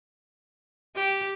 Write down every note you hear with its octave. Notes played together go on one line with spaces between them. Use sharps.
G4